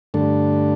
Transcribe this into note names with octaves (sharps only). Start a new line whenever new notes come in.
G2 D3 A3 D4 A4